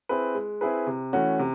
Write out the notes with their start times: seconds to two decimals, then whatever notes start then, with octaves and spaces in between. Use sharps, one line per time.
0.09 C4 E4 G#4 B4
0.35 G#3
0.61 C4 E4 G#4 B4
0.87 C3
1.13 E3 A3 C#4 F#4
1.39 C3